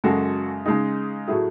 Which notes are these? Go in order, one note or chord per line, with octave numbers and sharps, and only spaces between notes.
F#2 C#3 G#3 F#4 A4
C#3 G#3 D#4 G#4
A2 F#3 A3 E4 G#4